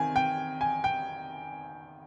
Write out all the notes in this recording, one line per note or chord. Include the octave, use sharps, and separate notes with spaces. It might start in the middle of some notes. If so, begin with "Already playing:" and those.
Already playing: C3 D#3 G#5
G5
G#5
G5